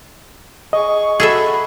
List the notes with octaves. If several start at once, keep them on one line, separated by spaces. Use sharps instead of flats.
G#4 D#5 C#6
F#4 G#4 A4 E5 B5